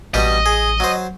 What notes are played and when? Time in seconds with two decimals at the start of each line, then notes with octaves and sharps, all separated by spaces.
0.14 A1 B2 G3 G4 D#5
0.46 G#4
0.80 F#3 C5